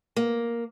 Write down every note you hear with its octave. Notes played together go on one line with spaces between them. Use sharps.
A#3